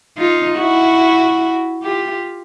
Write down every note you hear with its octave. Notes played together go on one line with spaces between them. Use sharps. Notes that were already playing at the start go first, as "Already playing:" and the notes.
D#4 F4
E4 F#4
F4 G4